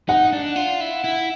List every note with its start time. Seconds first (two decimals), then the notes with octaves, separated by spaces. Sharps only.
0.09 D#4 F#5
0.33 D4
0.56 F4
0.81 E4
1.04 E4